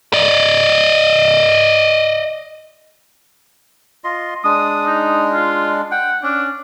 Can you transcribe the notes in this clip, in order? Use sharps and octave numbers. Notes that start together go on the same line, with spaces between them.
D5 D#5
F4 D#5 C6
G#3 D4 D#6
D#4
F4
F#5 G5
C#4 D4